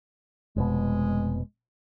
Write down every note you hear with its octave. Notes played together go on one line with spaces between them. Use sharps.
F1 B2 G#3